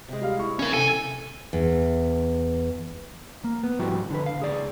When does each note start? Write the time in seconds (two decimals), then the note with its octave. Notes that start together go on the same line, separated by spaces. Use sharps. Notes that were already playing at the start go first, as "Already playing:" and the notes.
0.08 C3 G#3
0.22 G3 F5
0.38 E4 C#6
0.59 F2 C#4 F4 A#4 F5
0.73 C3 A4 G#5
1.53 E2
3.44 A#3
3.63 B3
3.79 G#2 F3 G3 E4 F#4 G5
4.11 D3 B4
4.26 F5
4.39 C#2 G#4 D5